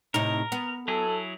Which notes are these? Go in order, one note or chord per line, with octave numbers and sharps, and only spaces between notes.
A2 C3 D#4 A#4
B3
F#3 E4 G#4 A4